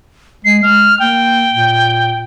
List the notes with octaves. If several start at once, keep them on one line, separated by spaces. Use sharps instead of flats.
G#3 C7
G#3 F6
A#3 G5
A#2